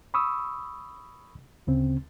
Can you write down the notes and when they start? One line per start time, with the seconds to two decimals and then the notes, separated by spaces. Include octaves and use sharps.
0.14 B5 C#6 D#6 E6
1.67 D2 C#3 C4